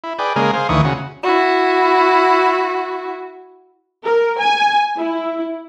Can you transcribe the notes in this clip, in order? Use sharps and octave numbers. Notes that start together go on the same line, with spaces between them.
E4
G#4 B4 D5 G5
C#3 G#3 A#3 G#4 A#4
G#4 C5 F5
D2 D#3 E3 C#6 D#6
C#3 F#4
E4 F#4
A#4
G#5
E4